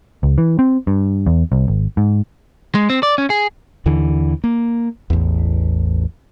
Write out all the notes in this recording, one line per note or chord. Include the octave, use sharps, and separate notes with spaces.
C#2
E3
C4
G2
E2
C2
G#1
G#2
G#3
C4
D5
C#4
G#4
D#2 D3 E3
A#3
A1 E2